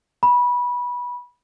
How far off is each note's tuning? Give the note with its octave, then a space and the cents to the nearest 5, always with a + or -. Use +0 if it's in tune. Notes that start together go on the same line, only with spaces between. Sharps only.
B5 -20